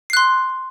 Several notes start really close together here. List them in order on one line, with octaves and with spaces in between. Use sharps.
C7 F#6 C6